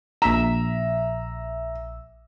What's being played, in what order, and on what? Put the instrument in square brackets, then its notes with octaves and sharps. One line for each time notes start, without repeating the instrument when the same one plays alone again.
[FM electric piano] A#1 E5 E6 [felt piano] A#5